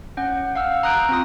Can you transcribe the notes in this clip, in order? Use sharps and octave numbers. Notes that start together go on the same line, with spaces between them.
C#4 F#5 G6
F5 F#5 E6 F6
A#5 D#6 F#6 G6 D7
C4 F4 D#6